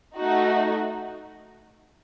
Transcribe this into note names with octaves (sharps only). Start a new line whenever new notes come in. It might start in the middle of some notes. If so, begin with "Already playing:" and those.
A3 D#4 F#4